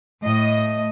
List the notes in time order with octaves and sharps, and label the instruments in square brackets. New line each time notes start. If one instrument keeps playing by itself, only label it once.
[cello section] A2 D#5